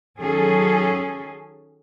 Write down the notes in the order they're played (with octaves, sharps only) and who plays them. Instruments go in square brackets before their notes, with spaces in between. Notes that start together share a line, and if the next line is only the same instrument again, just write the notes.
[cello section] D#3 F#3 C#4 G#4 A4